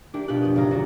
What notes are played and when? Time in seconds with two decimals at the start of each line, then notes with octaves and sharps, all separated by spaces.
0.14 A#3 D4 E4 G4
0.28 B2 F4 G4 F#6
0.41 F1 B3 D#6 G6
0.56 G#1 C#3 F5 A#5
0.71 D2 F#4